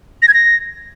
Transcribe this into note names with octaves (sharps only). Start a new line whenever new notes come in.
A#6
G#6
A#6